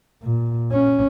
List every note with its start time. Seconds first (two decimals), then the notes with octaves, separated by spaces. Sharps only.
0.23 A#2
0.72 C#4